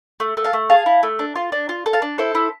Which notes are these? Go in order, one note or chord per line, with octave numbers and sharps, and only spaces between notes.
A3
A3
F5 A5
A3
G#4 F5 A5
E4
A3
D4
F4
D4
F4
A4
F5 A5
D4
E4 A4 C5
E4